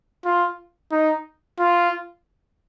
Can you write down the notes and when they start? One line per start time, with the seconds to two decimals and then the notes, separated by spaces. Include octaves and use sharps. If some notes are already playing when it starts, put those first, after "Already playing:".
0.25 F4
0.92 D#4
1.59 F4